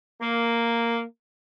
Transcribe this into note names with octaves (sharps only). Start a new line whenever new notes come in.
A#3